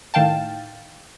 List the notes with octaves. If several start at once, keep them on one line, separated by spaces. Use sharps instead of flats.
A2 D#3 F5 G5 A5